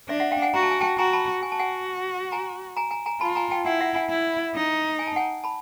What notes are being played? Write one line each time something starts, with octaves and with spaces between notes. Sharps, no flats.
D4 D5 E5
E5 F#5
F5 G5
F#5 G#5
F#4 A#5
A5
G#5
G5 A5
F#4 G#5 A#5
A5 B5
F#4 G#5
A5
F#5 G#5
G#5 A#5
G#5 A#5
G#5 A#5
G#5 A#5
F4 A5 B5
G#5 A#5
G5 A5
E4 F#5 G#5
E5 F#5
F#5 G#5
E4
D#4
G#5
A5
F#5 G#5
A5 B5